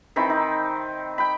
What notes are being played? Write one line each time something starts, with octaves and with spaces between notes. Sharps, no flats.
D#3 E3 C4 B5
D#4
G5 B5